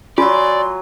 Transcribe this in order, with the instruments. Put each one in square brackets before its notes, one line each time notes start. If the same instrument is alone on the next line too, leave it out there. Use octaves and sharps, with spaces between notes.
[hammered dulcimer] F#3 G#5 [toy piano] F4 [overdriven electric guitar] D5 [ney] C6